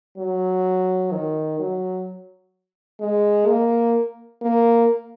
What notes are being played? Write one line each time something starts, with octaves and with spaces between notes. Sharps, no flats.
F#3
D#3
F#3
G#3
A#3
A#3